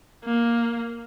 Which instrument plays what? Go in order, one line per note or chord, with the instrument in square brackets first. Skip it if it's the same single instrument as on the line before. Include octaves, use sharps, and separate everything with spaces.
[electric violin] A#3